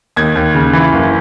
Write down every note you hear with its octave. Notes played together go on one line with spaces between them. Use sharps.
D#2 G#6
D#2
C#3
E3
F#1